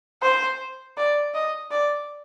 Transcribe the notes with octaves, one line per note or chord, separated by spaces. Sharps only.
C5
D5
D#5
D5